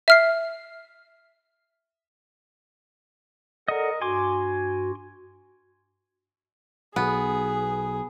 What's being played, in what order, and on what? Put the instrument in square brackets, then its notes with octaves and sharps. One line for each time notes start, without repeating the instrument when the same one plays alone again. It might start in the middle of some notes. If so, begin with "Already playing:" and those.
[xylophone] E5 F6 C7
[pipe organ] A4 D5 F#5 [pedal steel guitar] A#4 D#5
[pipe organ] G2 F#4 [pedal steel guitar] G#5 C6 D6
[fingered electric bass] B1 [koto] B3 [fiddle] G#4